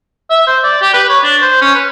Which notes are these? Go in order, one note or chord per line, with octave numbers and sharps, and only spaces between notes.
E5
C5
D5
G4
B4
C#5
D4
C5
C#4
B4